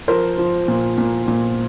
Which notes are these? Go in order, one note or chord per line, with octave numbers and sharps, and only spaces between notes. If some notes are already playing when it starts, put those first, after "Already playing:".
F3 A#4 C5
F3
A#2
A#2
A#2